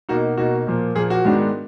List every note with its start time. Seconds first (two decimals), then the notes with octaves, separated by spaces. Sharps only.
0.09 B2 A#3 D#4 F#4
0.37 B2 A#3 D#4 F#4
0.67 A#2 F3 A#3
0.95 A#2 F3 A#3 G#4
1.10 F#4
1.25 G#2 D#3 G#3 B3 D4